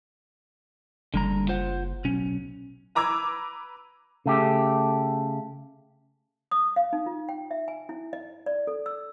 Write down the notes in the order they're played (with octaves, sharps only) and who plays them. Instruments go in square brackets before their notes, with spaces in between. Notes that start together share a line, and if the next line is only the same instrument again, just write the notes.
[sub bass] F#1 [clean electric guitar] D3 G3 A#5
[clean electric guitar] F4 C5 F#5
B1 C#4
[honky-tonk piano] B4 A#5 D6 E6 G#6
[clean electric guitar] C#3 A3 G4
[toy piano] D#6
F5
D#4
F4
G5
E5
G#5
E4
D#5
D5
A4
E6